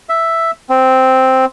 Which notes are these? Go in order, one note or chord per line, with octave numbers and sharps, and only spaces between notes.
E5
C4